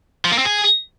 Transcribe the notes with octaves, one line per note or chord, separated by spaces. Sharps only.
F3
A#3
C4
G#4